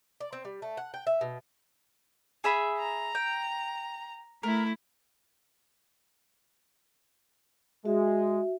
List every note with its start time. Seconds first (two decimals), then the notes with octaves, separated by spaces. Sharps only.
0.20 D5
0.33 C4
0.45 G3
0.62 A3
0.77 F#5
0.94 G5
1.07 E5
1.21 B2
2.44 G#4 E5 B5
2.78 A#5
3.15 G5
4.43 A3 E4 A#4
7.85 G#3 F#4 E5